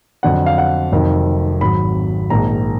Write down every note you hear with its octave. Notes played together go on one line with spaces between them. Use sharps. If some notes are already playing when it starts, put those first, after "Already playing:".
F2 D3 F#3 F#5
F5
F#5
F1 F2 D#3 F#3
G#1 G#2 F#3 B5
A#1 G#2 D#3 A#5